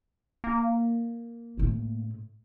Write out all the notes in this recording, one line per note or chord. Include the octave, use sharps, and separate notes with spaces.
A#3
A2 C#3